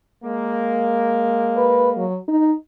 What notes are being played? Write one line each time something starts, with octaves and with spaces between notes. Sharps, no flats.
G#3 A#3
B4
F#3
D#4